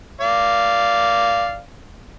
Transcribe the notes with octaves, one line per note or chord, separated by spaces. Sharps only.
D5 F5